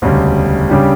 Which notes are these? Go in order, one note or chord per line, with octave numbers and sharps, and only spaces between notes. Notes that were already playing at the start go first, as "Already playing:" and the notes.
E1 D2 C#3 G3
C#3 G3 D4 G4